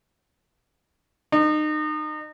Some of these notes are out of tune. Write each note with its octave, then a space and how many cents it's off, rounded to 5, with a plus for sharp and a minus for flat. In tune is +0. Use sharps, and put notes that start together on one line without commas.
D#4 -30